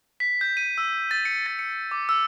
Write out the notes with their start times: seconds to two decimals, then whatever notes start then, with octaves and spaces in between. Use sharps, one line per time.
0.20 B6
0.41 G6
0.57 D#7
0.78 E6
1.11 A6
1.25 C#7
1.46 A6
1.59 C#7
1.91 D6
2.09 E6